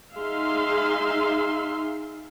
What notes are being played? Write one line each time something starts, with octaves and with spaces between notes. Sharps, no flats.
D#4 G#4 E5 F5 C6